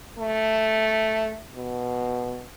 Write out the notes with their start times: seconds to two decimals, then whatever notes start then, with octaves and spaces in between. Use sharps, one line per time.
0.18 A3
1.55 B2